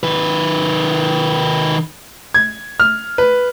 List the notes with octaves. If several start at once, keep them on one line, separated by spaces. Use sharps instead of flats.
D#3 B4
G#6
F6
B4